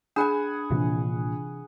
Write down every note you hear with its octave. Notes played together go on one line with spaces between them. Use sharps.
D4 G#4 F#5 G#5 B5
A#1 C3 E3